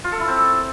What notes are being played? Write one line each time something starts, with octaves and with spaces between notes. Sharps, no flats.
F4
A4
E4
C4